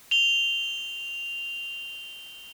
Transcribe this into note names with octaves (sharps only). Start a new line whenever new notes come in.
F7 G7